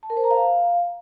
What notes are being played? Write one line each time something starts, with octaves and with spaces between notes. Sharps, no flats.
A5
A#4
C5
A#5
F5